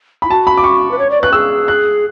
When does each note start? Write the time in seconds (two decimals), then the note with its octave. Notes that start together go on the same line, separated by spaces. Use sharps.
0.22 B5
0.25 E4
0.30 F#4 A5
0.47 B5
0.57 D6
0.64 C#6
0.91 B4
0.99 C#5
1.10 D5
1.21 B4 F#6
1.33 G#4 E6
1.68 F#6